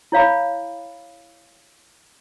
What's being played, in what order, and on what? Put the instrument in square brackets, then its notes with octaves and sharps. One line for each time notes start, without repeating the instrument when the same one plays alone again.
[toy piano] E4 C#5 F5 B5